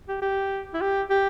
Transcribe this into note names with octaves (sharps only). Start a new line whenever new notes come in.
G4
G4
E4
G4
G4